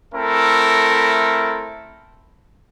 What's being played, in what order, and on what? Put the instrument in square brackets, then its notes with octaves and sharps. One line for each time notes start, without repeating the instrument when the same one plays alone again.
[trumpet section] A3 C4 E4 A4 A#4